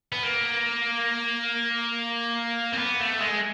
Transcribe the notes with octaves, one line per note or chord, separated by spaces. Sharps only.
B3
A#3
C4
B3
A3
G#3